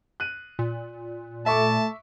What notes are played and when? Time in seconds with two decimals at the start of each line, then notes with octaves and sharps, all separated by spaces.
0.20 F#6 D#7
0.59 A#2
1.46 A3 E5 A5 C#6 D6